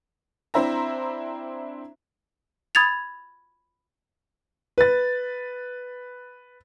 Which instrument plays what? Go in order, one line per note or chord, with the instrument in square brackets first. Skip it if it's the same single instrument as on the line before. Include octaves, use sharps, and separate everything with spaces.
[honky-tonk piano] C4 D4 E4 C5 E5 A#5
[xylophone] B5 D#6 G#6 A6 F7
[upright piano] B4 A6